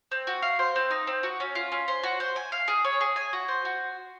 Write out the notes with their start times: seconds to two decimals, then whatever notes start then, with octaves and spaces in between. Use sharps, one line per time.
0.11 C4
0.27 F#4
0.42 F5
0.59 C5
0.76 C4
0.91 D#4
1.07 C4
1.23 F#4
1.40 C#4
1.55 F4
1.72 C#4
1.88 C5
2.03 F#4
2.20 C5
2.36 G#5
2.52 F5
2.68 G#4
2.84 C#5
3.01 G#4
3.16 G#5
3.33 F#4
3.48 C5
3.65 F#4